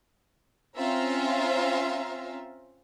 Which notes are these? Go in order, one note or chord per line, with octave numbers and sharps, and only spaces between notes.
C4 C#4 F4 E5 F5 A#5